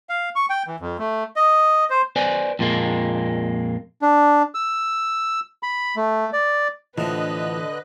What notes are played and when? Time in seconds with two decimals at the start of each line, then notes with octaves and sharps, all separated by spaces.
0.09 F5
0.36 C#6
0.50 G5
0.67 E3
0.80 F2
0.99 A3
1.36 D#5
1.90 C5
2.16 B4 C5 D5 G#5
2.59 F2 A#2 G#3 A#3
4.02 D4
4.55 E6
5.63 B5
5.96 A3
6.33 D5
6.98 A2 D3 E3 F3 B4 D#5 F#6